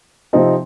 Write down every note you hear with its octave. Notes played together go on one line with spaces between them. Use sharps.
C3 F3 C4 D#4